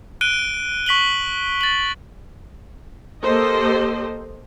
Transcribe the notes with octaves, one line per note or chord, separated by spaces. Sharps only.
F#6 D7 D#7 G7
C#6 B6 F#7 G7
A6 F#7
A#3 G4 A4 C5 D#5